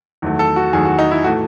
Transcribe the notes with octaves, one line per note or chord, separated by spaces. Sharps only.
E2 D#3 F#3 A3
A4
F#4
E2 D#3 F#3 A3 G#4
F#4
D#4
E4
A2 E3 A3 F#4